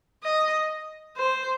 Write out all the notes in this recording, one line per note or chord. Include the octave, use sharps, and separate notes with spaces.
D#5
C5